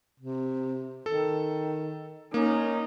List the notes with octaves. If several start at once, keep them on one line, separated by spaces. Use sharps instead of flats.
C3
D#3 A4
A#3 C#4 D#4